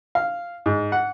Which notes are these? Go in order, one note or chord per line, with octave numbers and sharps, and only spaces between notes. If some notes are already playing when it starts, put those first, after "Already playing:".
F5
G#2
F#5